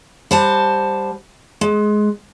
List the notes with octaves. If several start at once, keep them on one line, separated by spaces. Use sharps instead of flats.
G3 C5 F#5 A5
G#3